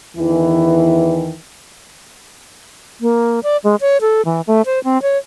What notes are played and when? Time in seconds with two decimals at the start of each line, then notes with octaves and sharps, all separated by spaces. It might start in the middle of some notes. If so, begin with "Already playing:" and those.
0.17 E2 D#3 E3
3.01 A#3
3.43 D5
3.64 G#3
3.81 C#5
4.01 A4
4.25 E3
4.47 A3
4.66 C5
4.84 C4
5.02 C#5